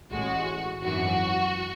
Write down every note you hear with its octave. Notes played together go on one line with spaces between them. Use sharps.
A1 A2 G#3 F#4
G#1 F#2 E3 F#4